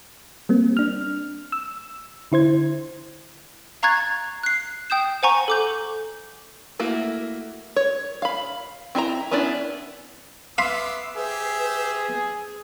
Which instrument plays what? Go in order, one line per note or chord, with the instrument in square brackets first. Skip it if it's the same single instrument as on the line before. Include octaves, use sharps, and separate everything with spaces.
[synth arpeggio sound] G3 A#3 C4
D4 F6
E6
D3 E4 C5 G#6
[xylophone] F5 A#5 C#6 F#6 G#6 A6
F#6 C7
G5 D#6 G6 E7
C5 F#5 G#5 A#5 C#6
A4 D6 G6
[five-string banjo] A3 A#3 E4 F#4
C#5
F5 B5
C4 E4 D#5 A#5
B3 C#4 D4 E4 D5
[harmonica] B3 D6 E6 [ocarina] E5 [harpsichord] F5 B5 C6
[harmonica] G4 C5 E5 [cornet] G#4 [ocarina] B4